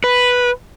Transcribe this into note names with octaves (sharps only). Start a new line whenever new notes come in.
B4